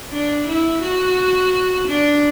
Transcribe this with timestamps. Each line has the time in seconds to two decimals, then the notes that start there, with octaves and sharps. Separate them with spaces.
0.12 D4
0.48 E4
0.82 F#4
1.88 D4